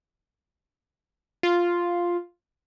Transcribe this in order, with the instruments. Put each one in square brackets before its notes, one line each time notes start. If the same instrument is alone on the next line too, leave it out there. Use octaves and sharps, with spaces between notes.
[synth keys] F4